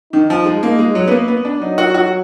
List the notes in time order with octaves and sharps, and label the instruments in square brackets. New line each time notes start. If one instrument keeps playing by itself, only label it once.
[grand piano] D#3 [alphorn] D#4
[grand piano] F3
G#3
A#3
G#3
F#3
B3
A#3
B3
D4
[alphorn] F#3 [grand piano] D#4
[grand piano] F#4
F#4